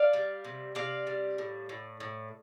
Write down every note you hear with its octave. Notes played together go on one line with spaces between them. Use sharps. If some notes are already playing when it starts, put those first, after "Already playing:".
Already playing: D5 F5
G3
C3
C3 D5 F5
G3
A2
A2
A2